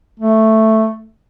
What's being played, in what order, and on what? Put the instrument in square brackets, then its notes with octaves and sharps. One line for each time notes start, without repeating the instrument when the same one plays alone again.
[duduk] A3